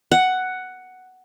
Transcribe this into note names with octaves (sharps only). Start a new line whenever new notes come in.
F#5